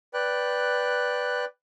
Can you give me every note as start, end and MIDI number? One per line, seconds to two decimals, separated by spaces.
0.14 1.45 71
0.14 1.45 74
0.14 1.45 79
0.14 1.45 90